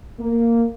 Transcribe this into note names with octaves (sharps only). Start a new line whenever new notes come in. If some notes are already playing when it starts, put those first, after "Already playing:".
A#3